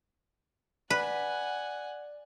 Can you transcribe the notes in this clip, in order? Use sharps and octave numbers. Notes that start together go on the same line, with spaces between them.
B4 D5 F#5 G#5